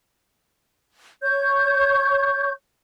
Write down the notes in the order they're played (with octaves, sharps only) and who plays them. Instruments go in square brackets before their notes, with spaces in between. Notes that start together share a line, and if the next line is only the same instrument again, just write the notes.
[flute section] C#5 C#6 G6